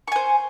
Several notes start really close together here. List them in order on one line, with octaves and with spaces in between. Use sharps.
C#6 G#5 C5